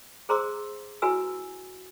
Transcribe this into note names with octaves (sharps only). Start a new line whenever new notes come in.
G#4 C5 A#5 C6 D6 E6
E4 F#4 B4 G#5 E6